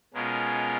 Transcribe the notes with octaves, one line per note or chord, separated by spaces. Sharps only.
B2 G#3 C#4 F4 A#4